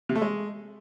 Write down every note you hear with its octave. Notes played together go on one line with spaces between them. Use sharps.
C3
A3
G#3